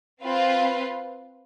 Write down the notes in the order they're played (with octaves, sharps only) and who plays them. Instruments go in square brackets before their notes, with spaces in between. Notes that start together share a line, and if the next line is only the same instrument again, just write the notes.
[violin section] C4 F4 B4 F5